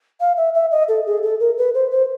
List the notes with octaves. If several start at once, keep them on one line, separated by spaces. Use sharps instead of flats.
F5
E5
E5
D#5
A4
G#4
A4
A#4
B4
C5
C5